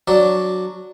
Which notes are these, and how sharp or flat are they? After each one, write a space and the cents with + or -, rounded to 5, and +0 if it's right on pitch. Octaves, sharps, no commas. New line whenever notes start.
F#3 +0 D4 +0 D5 +0